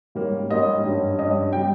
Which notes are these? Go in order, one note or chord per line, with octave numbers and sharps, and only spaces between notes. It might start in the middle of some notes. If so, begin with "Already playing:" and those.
G#2 G3 A#3 C#4
G#2 G3 A#3 C#4 D#5
G2 G3 C#4
G2 G3 C#4 D#5
C#3 G3 G5